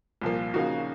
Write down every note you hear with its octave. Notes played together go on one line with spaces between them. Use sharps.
C2 A#2 F3 A#3
C#3 F3 A#3 D#4 F#4